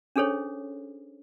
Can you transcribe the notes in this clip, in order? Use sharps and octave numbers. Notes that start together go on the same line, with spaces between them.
C#4 D4 G#4 A4 C5 C#5